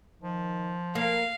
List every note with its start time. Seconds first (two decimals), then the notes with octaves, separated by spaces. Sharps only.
0.22 D#3 F3
0.95 A#3 A#4 F5